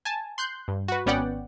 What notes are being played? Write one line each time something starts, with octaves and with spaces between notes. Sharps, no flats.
G#5 A5
C6 F#6 G6
G2
F#4 B4
G#1 B3 C#4 D5 F#5 G5